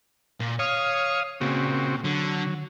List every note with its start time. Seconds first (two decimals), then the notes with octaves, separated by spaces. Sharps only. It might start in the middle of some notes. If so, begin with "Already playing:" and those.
0.40 A#2
0.59 C#5 F5 D#6
1.41 A#2 C#3 C4 F#4
2.04 D3 F#3